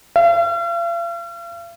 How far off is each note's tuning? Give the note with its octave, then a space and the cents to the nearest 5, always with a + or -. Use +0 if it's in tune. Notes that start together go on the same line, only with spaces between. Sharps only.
F5 -45